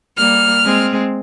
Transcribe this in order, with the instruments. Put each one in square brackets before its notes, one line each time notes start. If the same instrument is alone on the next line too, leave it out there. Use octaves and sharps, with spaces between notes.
[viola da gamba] G3 A#3 [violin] F6
[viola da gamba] G#3 C4